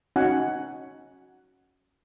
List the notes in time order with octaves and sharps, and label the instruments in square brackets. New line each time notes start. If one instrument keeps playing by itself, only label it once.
[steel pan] C#4 D#4 F#4 F#5 G#5